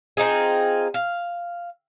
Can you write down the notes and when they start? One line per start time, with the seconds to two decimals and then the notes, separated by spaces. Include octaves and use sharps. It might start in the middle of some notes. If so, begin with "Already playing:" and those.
0.17 C4 D#4 F4 G#4
0.94 F5